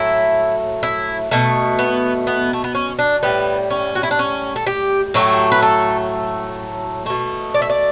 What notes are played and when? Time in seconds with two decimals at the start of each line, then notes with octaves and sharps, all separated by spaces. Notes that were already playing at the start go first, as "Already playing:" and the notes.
Already playing: A2 F#3 A3 E4
0.83 E4
1.31 B2 A3
1.79 B3
2.27 B3
2.53 A3
2.64 B3
2.75 C#4
2.99 D4
3.23 A2 G3 B3
3.70 C#4
3.95 F#4
4.03 E4
4.11 D4
4.19 C#4
4.56 A4
4.67 G4
5.14 A2 F#3 A3 G4
5.52 B4
5.63 A4
7.06 B2 A3
7.54 D5
7.62 E5
7.70 D5